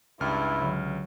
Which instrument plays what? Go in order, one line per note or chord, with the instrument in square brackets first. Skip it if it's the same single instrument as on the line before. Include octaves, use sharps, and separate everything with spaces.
[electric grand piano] C#2 F6 [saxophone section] G2 [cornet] E4
[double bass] D3 F#3